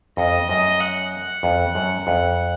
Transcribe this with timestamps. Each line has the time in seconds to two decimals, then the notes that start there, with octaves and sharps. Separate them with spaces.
0.17 F2 D#5
0.49 F#2 D#5
0.80 F#5
1.43 F2
1.75 F#2
2.07 F2